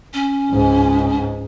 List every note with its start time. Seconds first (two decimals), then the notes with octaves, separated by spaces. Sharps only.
0.14 C#4
0.50 C#2 G#2